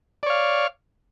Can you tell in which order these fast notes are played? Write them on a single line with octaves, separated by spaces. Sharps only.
D5 C#5 F5